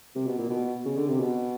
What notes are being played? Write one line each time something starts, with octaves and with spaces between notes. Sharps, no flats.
C3
B2
A#2
B2
C#3
D3
C3
B2